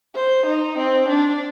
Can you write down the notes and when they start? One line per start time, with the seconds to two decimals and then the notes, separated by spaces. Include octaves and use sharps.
0.15 C5
0.46 D#4
0.78 C4
1.08 D4